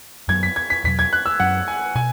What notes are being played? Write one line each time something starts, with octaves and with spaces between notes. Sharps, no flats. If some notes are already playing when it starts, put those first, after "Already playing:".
F#2 F#3 B3 G#6
B6
G#6
B6
E2 B2 F#3 B6
G#6
F#6
E6
F#2 F#3 C#4 F#5
G#5
B2 G#5